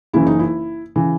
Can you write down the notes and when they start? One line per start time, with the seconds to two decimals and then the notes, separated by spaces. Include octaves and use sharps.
0.13 F#1 F#2 C#3 E3 E4
0.27 D#4
0.39 E4
0.96 C#3 E3